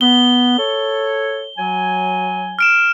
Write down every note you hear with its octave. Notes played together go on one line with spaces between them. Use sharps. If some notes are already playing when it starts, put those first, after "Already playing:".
B3 G7
A4 C#5
F#3 G#5
F6 D7 E7